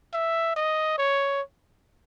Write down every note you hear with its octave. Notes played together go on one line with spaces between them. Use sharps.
E5
D#5
C#5